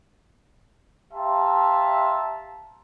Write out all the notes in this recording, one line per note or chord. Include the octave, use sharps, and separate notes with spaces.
G4 E5 F5 A5 A#5 C6